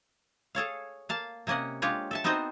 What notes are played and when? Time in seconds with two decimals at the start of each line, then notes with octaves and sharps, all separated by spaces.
0.55 G#4 A4 C#5 F5
1.09 A#3 F5 A5
1.47 C3 A#3 C#4 D#5 F#5
1.82 G#3 D4 F4 G4 C#5
2.11 A4 E5 A5
2.24 B3 C4 D#4 F#4 C5 D#5